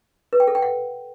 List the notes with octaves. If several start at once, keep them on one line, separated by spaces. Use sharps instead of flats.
B4
G5
A4
G5
F#5